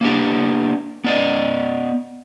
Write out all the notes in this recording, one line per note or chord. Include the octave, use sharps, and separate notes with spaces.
A#3 B3 D4 G4
B3 D5 D#5